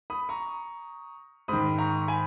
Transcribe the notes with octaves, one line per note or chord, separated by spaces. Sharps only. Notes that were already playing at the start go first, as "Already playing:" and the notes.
B5 D#6
A#5 C#6
G#2 D#3 B5 D#6
A#5 C#6
G#5 B5